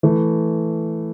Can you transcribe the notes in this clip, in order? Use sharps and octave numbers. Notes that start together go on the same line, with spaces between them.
E3 A3